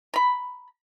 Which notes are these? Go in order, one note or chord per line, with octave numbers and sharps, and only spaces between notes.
A#5 B5